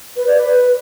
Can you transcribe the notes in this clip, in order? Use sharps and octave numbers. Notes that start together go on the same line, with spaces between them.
B4
D5
B4